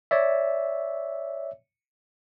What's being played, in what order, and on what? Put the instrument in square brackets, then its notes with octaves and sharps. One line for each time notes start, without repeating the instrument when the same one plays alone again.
[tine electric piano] C#5 D5 E5